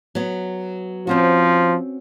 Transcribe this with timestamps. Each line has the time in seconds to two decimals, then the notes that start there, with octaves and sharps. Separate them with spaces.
0.15 F#3 B3
1.07 F3 C4 C#4 F#4